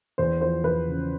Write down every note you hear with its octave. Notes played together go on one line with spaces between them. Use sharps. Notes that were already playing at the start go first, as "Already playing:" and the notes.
E2 C5
F3 C5
E2 B4
C#3